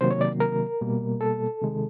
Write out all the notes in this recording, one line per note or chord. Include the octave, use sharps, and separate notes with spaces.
C3 D#3 F#3 A#3 C5
C#5
D5
A#4
B2 G3 A#3
A4
C3 D#3 G#3